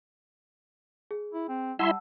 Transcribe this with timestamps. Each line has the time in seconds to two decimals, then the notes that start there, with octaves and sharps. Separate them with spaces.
1.11 G#4
1.34 E4
1.49 C4
1.79 G3 E4 E5 F#5 A5 C6 E6